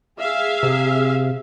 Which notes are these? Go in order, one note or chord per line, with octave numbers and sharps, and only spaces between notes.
G#4 E5 F5
C3